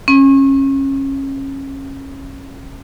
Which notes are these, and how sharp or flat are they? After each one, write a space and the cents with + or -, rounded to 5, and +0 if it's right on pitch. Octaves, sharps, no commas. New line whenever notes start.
C#4 -25